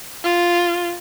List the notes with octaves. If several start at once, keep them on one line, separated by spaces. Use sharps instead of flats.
F4